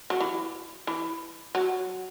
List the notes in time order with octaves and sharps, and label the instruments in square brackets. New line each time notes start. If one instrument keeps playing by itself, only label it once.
[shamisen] F#3
E3
E3
F#3